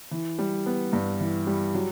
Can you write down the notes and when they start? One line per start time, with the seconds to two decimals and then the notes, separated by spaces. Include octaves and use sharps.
0.11 E3
0.39 G3
0.66 B3
0.93 G2
1.20 E3
1.47 G3
1.74 F#3